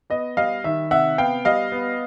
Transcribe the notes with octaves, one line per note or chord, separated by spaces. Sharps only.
B3 D#5
G3 D#5 F5
D#3 E5
C3 E5 F#5
B3 F5 G5
G3 D#5 F5
B3